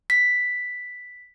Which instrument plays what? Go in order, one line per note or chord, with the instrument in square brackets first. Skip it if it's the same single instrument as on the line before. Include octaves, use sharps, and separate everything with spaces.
[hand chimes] B6